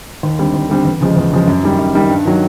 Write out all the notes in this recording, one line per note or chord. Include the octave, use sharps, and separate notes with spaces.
D#2
D3 G3 C4
D#2
D3 G3 C4
E2
C#3 F3 G#3
E2
C#3 F3 G#3
F#2
D#3 G3
F#2
D#3 G3
G2
D#3 F#3